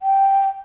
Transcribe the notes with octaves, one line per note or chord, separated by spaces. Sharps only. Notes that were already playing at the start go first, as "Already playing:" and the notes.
G5